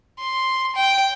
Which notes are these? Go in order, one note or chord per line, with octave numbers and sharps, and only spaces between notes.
C6
G5